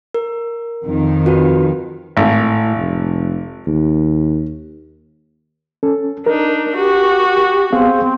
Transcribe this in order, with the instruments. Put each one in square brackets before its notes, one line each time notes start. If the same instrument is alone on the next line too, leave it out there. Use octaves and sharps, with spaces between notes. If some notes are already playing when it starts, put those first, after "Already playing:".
[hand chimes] A#4
[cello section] F2 D#3
[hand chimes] F4 F#4 B4
[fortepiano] G#1 [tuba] A2
[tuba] F1
D#2
[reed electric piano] C#4 A4
[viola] D4 D#4 [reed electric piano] A#4
[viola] F#4 [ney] G4
[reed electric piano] B3 G#4 F5 [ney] C4